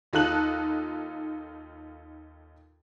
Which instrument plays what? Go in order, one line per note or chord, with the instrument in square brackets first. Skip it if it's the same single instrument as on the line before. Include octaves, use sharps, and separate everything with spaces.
[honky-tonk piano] D#2 D#4 F4 A4 F#6 F#7